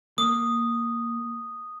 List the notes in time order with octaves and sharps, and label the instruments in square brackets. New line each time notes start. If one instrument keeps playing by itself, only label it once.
[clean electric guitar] A#3 [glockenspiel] D#6